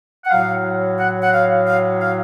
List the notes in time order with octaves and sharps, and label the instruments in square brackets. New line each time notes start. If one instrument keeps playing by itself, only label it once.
[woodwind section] F#5
A2 F#3 F5
F#5
F#5
F5
F5
F5